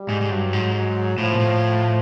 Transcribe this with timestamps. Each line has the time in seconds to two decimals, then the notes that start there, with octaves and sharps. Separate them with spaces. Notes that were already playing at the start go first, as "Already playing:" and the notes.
Already playing: G3
0.09 G#2
0.21 G#2
0.30 G2 F#3
0.53 G#2
0.74 F#3
1.18 A2 F3
1.34 A#2
1.40 A2